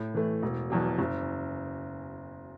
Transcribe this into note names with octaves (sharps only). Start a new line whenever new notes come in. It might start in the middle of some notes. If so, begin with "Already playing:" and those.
Already playing: A2
E3 A3
E1
E2 B2 F#3
F#1